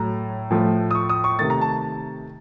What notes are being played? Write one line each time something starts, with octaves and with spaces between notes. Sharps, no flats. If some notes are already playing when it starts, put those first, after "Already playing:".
Already playing: A2 F#3 A3 A#5
A2 F3 A3
D#6
C#6
D#6
C#6
C3 D#3 A3 A6
A#5
A5